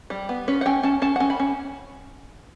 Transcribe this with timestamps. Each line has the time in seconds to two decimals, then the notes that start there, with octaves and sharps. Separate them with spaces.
0.10 G3
0.29 B3
0.48 C#4 B4
0.61 F#5
0.66 C#4 G5
0.83 C#4 A5
1.02 C#4 A5
1.16 F#5
1.20 C#4
1.30 B5
1.40 C#4